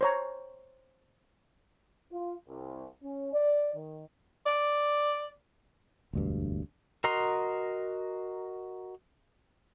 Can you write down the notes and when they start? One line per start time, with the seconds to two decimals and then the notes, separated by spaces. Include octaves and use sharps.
0.01 C5 C#5 A#5
2.11 F4
2.48 C2
3.03 C#4
3.33 D5
3.74 D#3
4.46 D5
6.13 E1 D2 G2
7.04 F#4 A#4 D#5 A#5 C6